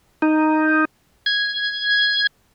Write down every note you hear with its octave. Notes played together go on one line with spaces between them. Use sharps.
D#4
G#6